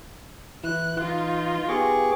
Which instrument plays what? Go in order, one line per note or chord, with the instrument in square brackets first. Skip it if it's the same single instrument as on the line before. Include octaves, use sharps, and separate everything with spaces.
[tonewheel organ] E3 E4 [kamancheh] F#6
[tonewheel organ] E3 [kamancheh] D#4 F4
[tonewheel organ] B3 G4 D6 [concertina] G#4 C#6